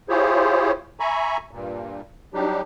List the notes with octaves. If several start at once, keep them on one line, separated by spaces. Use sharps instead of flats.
E4 F4 G4 G#4 C5 C#5
E5 G#5 A#5 B5 C#6
G2 A#2
F#3 G3 D4 D#4 G4